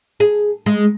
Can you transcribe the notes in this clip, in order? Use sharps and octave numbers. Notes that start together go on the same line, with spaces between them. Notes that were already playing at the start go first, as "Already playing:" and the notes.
G#4
G#3